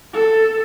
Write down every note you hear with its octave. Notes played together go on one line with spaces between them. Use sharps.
A4